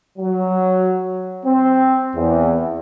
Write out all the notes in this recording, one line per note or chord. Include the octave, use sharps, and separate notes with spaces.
F#3
C4
E2